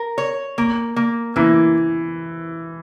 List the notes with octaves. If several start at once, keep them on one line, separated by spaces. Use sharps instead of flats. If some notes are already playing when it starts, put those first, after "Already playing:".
Already playing: A#4
C#5
A#3
A#3
E3 A#3